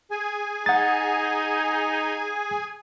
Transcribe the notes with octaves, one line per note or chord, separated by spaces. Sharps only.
G#4 G#5
D#4 F#5 A6